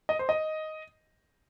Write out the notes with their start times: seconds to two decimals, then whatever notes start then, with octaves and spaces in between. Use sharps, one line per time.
0.09 D#5
0.19 C5
0.29 D#5